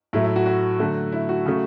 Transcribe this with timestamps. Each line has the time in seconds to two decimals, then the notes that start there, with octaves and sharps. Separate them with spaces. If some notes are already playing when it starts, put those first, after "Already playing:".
0.13 A2 F#3 A3 E4
0.24 E4
0.36 F#4
0.46 F#4
0.79 D3 F#3 A3
1.12 E4
1.29 F#4
1.46 C#3 F#3 A3